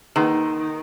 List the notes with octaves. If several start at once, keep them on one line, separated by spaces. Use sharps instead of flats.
D#3 A#3 D#4 G#4 B4